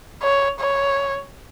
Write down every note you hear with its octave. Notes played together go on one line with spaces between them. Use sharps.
C#5
C#5